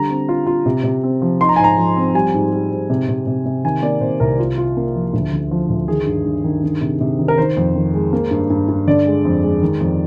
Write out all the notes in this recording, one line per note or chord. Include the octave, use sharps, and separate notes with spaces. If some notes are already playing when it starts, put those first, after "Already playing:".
Already playing: D3 G3 A#5
C4
F4
F4
C3
C3
C4
F3
D#4 C6
A#5
G#5
G#2 A#5
F3
C4
G3 G#5
G#2
G3
G#2
C3
C3
C3
C3
D#3 G#5
A#3 D5
C3 C5
C2 A#4
F4
F4
A#3
F3
D2
D3
F3
D2
D#3 G#4
G2
G2
D#3
D#3
C3
C3
D#3
A#4
D#3 C5
F2
D#3
G#3
A#3
G2
G2
G2
D3 D5
G#3
F2
G#3
D#3
F2